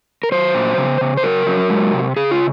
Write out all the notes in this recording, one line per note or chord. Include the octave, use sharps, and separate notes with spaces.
A#4
F#3 C5
A#2
C#3
C#3
C5
F#3 A#4
F#3
G#3
C3
C#3 G#4
F4